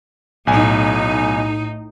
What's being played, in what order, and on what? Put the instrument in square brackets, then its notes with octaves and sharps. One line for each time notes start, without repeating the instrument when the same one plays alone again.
[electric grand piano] B1 G#5 [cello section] A2 D#4